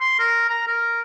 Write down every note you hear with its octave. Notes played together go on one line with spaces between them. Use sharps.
C6
A#4
A#5
A#4